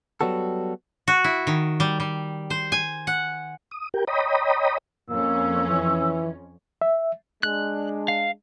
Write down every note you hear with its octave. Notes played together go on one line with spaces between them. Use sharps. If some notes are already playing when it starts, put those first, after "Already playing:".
F#3 G3 B3 F#4 A4
F#4
E4
D#3
G3
G3
C5
G#5
F#5
D#6
G4 A#4 G5
C#5 D#5 G5 A#5 B5 D#6
F2 A#3 C#4 E6
E3
E5
G#3 D4 F#6
F5